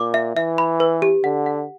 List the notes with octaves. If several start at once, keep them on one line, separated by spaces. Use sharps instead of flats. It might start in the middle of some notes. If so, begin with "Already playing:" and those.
Already playing: A#2 D6
E5
E3 E5
B5
B4
G4
D3 F#5
F#5